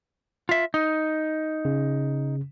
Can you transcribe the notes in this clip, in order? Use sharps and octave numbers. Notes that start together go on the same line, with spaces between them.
F4 E5
D#4
C#3